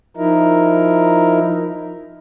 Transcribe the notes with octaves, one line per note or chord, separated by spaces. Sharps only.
F3 D#4 E4 A#4